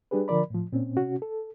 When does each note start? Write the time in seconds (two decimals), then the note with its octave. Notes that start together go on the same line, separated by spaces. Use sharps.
0.11 G3 D4 G4 G#4 B4
0.28 D3 F3 A#4 D5 B5
0.50 A2 F3
0.73 A#2 C4 C#4
0.97 C3 C#4 F#4
1.22 A4